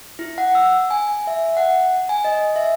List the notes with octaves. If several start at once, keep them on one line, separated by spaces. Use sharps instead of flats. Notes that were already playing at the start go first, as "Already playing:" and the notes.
E4
F#5
E6
G#5
E5
F#5
G#5
D#5
E5